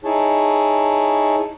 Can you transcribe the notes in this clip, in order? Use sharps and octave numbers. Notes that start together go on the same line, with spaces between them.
D#4 E4 G#4 C#5 A5